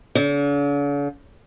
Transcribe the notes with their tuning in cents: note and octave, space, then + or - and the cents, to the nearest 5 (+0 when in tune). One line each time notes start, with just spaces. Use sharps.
D3 -45